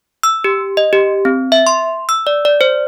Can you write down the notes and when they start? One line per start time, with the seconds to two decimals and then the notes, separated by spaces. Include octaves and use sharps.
0.23 E6
0.44 G4
0.77 D#5
0.93 G4
1.25 C4
1.52 E5
1.67 C6
2.09 E6
2.27 D5
2.45 D5
2.61 C5